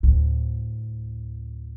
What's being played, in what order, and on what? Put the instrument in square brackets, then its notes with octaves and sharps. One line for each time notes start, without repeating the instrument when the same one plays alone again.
[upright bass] D2 A2